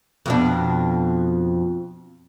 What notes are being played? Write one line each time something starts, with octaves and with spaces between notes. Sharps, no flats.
F2 B2 D4